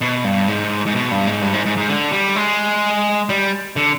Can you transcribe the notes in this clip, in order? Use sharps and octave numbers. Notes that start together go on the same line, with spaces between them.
B2
G2
G#2
G#2
B2
G2
G#2
G2
G#2
G#2
G#2
D3
G3
G#3
G3
D3